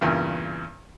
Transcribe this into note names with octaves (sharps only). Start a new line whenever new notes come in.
E2 G2 A#2 C#3